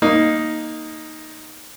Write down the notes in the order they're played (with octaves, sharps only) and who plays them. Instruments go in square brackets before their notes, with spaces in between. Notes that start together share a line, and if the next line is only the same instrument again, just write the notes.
[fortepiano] A#3 D#4